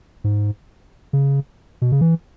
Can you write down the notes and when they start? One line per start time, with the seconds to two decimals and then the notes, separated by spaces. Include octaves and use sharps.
0.24 G#2
1.13 C#3
1.82 B2
1.92 C#3
2.01 E3